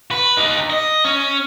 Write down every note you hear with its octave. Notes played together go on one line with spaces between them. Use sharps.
B4
D#4 G4
D#5
C#4